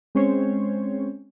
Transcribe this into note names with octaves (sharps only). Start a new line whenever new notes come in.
G#3 C4 C#4 C5 C#5